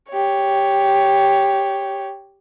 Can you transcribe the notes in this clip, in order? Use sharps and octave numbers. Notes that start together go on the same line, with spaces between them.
G4 C#5